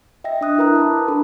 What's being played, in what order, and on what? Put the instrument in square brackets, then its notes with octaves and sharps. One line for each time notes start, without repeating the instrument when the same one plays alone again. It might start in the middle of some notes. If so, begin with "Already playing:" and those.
[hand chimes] D#5 E5 G5 A#6
D4 D#5 D#6 F#6
E4 A#4 B4 A#5 F#6
A5 B5 D6
D4 A4 A#5 B5